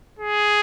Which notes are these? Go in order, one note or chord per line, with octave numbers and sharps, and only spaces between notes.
G#4